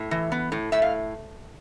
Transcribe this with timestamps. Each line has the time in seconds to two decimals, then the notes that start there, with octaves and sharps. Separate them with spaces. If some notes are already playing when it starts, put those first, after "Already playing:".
Already playing: A2
0.11 E3
0.32 B3
0.52 A2
0.72 A2 E5
0.82 F5